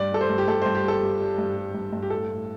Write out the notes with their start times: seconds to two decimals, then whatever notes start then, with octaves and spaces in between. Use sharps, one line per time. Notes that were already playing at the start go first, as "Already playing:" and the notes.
Already playing: G2 D5
0.12 G3 A4
0.21 C5
0.30 G2
0.38 G4
0.48 G2 A4
0.62 G2 C5
0.75 G4
0.84 G3 A4
1.02 G3
1.21 G3
1.38 G2
1.57 G3
1.75 G2
1.93 G2
2.02 G4
2.10 A2 A4
2.29 A2